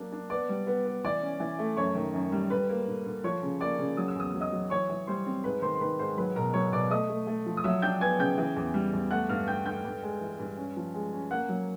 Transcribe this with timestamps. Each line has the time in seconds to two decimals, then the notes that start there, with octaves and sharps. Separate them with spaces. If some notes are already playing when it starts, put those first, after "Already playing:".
Already playing: F#3 A#3 D4
0.12 D4
0.30 B3 D5 D6
0.49 G3
0.67 B3
0.85 B3
1.05 E3 D5 D6
1.22 C#4
1.40 E3
1.59 A3
1.77 F#2 C#5 C#6
1.95 D#3
2.13 F#2
2.32 G3
2.50 D3 B4 B5
2.69 A#3
2.88 D3
3.06 D3
3.24 F3 C#5 C#6
3.42 C#3
3.61 A#3 D5 D6
3.79 C#3
3.97 F#3 D#6
4.08 E6
4.16 E2 D#6
4.31 F#3 E6
4.41 D#5 D#6
4.52 F#3
4.70 E3 C#5 C#6
4.89 E3
5.07 G3 C5 C6
5.26 C4
5.44 G#2 B4 B5
5.62 D#3 C5 C6
5.75 C6
5.80 D#3 B4 B5
5.99 G#2 C5 C6
6.17 F#3 B4 B5
6.36 B2 A#4 A#5
6.54 F#3 C#5 C#6
6.72 B2 D5 D6
6.91 A3 D#5 D#6
7.09 A3
7.27 A3
7.46 F3
7.57 D#6
7.64 F#3 E5 E6
7.82 D4 G5 G6
8.01 B3 G#5 G#6
8.19 C#3 G5 G6
8.38 E3
8.56 E2
8.74 G3
8.93 E2
9.10 A3 F#5 F#6
9.29 G2 F5 F6
9.48 D3 G5 G6
9.65 D3 G5 G6
9.84 G2
10.03 G#3
10.21 E3
10.39 G2
10.57 C#4
10.77 F3
10.94 G#3
11.13 C#4
11.31 A#3 F#5 F#6
11.49 F#3